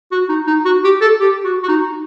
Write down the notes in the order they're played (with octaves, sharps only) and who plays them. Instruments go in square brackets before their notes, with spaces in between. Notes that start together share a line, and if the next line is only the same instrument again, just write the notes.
[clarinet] F#4
D#4
D#4
F#4
G4
A4
G4
F#4
F#4
D#4